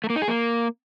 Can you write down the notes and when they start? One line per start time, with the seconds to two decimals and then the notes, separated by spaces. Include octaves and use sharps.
0.04 A3
0.10 A#3
0.16 D#4
0.22 G#4
0.28 A#3